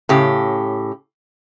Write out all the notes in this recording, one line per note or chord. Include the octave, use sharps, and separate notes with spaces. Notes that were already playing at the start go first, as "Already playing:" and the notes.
A2 C#3 G4